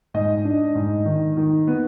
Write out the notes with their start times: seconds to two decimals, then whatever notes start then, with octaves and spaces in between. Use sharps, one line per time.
0.14 G#2 D#5
0.45 D4
0.75 G#2
1.05 D#3
1.37 D#3
1.67 B3